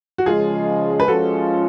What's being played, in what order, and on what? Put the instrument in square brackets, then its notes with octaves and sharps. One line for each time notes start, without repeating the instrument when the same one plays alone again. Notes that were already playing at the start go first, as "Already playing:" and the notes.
[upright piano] F#4
[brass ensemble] C#3 F3 G#3 [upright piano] F4 G#4
[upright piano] B4
[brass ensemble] F3 G#3 C#4 F4 [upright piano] F#4 A4